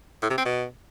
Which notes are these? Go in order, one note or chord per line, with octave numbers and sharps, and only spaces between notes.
A2
C3
C4
B2